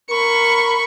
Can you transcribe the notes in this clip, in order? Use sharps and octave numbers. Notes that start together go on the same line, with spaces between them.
A#4 B5 C#6